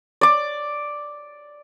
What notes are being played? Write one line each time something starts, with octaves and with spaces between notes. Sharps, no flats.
D5 D6